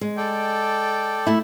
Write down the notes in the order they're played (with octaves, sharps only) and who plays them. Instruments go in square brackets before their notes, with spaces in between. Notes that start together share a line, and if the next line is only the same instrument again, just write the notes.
[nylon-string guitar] G#3
[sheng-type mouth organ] A4 D5 G5
[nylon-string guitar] A3 E4